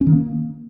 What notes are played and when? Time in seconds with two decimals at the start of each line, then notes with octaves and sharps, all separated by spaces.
0.01 C#4
0.07 D#3
0.12 A#3